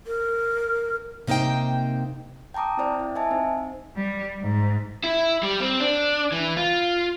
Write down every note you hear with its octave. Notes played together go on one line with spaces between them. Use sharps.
A#4
C3 A#3 D#4 C5 G5
G5 A5 A#5 D6 D#6
C4 E4 C5 D5 G5
E4
D#5 E5 G#5 A5
C4 D#4 C5
G3
G#2
E4
G3
C4
D4
E3
F4